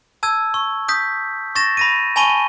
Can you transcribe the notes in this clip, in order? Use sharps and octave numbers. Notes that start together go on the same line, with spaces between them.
A5 E6 G#6
C#6
D#6 G6 B6
C#6 A6 A#6 E7
B5 A#6 D#7
G#5 A5 B5 C#6 D#7 G7